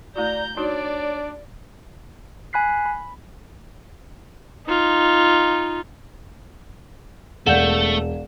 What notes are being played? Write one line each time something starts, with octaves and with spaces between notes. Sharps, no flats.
A3 E4 F#4 D5 A#5 G6
D4 D#4 F#4 C#5 D5
G#5 B5 F#6 B6 C7
B5
D#4 F4
E1 A3 D5 F5 F#5 G6 E7